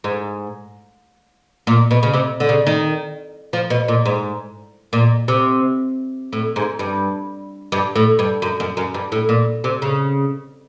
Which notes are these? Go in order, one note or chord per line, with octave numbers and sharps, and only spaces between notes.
G#2
A#2
B2
C#3
C3
D3
C#3
D#3
F3
B2
A#2
G#2
A#2
C3
A2
G#2
G2
G2
A2
G2
F#2
F#2
F#2
G2
A2
A#2
C3
C#3